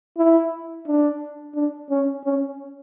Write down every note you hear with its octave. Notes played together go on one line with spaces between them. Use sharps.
E4
D4
D4
C#4
C#4